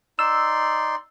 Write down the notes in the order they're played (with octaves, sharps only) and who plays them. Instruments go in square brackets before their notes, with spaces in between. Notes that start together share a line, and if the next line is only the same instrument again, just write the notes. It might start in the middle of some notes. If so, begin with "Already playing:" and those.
[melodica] D#4 D5 C6 [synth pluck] E6